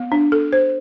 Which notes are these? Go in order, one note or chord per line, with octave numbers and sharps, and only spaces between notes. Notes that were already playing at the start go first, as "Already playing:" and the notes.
Already playing: B3
D4
A4
C5